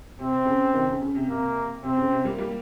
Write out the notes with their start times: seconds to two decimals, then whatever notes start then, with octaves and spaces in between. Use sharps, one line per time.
0.19 C3 C4
0.45 C#3
0.73 C3 D#3
0.87 C#3
1.01 C#3
1.15 C3
1.28 C3 A#3
1.83 C3 C4
1.97 C#3
2.11 C3
2.24 G3 A#3
2.38 G3 A#3